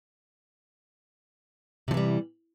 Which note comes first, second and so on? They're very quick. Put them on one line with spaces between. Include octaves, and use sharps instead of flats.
C3 F3 E3 G3